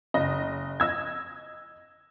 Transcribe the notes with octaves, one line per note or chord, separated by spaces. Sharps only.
F#1 D#5
D#5 E6 G#6